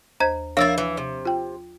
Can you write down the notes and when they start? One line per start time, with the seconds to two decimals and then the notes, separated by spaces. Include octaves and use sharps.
0.20 D#2 C5 A#5 G#6
0.57 F3 A#3 D4 E4 C#5 F5 E6 A6
0.78 E3
0.97 C3
1.25 F4 G5